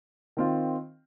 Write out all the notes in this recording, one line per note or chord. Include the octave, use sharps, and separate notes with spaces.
D#3 C4 F4